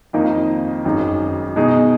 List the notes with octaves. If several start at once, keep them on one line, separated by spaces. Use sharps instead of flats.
F2 D#3 A#3 D#4
G#1 F#2 D#3 G#3 D#4
B2 G#3 D#4 G#4